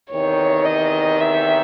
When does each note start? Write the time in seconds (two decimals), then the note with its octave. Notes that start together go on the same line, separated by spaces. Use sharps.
0.11 E2 C3 D#3 C#5
0.66 D#5
1.21 E5